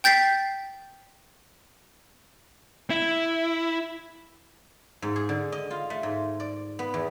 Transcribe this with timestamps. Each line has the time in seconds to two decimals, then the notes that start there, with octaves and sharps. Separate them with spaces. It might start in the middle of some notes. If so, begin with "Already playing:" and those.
0.04 G5 G6 A6 B6 C7
2.90 E4
5.02 G#2
5.16 G#4
5.29 D3
5.52 D#5
5.70 F4
5.90 A3
6.03 G#2
6.40 D5
6.79 B3
6.94 E2